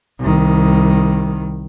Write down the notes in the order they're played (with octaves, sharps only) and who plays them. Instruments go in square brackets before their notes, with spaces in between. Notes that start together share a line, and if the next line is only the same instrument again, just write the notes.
[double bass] C2 D#3